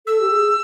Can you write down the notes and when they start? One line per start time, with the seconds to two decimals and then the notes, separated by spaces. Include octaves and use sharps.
0.07 A4 E6
0.21 G4
0.31 G#4